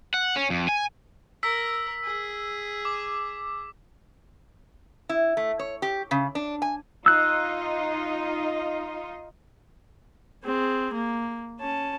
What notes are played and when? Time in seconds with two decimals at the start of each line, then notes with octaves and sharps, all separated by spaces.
0.14 F#5
0.36 C#4
0.50 F2
0.68 G#5
1.43 A#4 E6 B6
2.04 G#4
2.85 D6
5.09 E4
5.37 A3
5.59 C#5
5.82 G4
6.11 C#3
6.35 D4
6.62 G#5
7.06 D#4 F4 D#5 E6 F#6
10.44 C4 G#4
10.94 A#3
11.60 C#4 A5